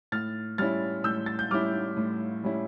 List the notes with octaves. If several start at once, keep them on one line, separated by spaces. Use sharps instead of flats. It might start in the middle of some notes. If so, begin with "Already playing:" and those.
A2 F6 A6
G3 C#4 E4 F6 A6
A2 E6 G6
A6
G6
G3 C#4 E4 D6 F6
A2
G3 C#4 E4